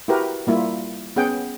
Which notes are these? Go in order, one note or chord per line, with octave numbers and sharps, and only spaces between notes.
E4 F#4 G4 A#4 B4
G3 A#3 E4 F4
B3 C#4 G#4 F#5 G5